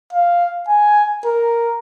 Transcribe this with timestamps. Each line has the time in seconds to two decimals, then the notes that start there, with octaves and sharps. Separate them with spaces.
0.13 F5
0.68 G#5
1.25 A#4